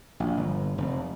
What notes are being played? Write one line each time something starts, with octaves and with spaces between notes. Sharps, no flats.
A#1
G1
F1